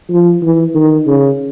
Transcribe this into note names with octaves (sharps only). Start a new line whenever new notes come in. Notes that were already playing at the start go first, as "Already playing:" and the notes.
F3
E3
D#3
C#3